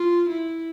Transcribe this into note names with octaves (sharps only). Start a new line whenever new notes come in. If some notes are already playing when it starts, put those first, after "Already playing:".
Already playing: F4
E4